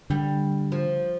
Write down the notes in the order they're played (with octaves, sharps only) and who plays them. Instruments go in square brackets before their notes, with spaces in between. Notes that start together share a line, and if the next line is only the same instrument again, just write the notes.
[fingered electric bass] D3 [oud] G3
[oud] F3